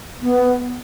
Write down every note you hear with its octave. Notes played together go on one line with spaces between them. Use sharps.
B3